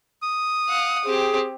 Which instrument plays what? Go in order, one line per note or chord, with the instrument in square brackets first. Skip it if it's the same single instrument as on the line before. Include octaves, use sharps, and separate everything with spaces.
[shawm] D#6
[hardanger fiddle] F5 F#5
[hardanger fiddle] C4 G4 [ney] G#4